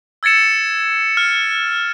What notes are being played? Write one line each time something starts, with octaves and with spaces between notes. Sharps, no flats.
E6 G#6 A6 C#7 E7
F6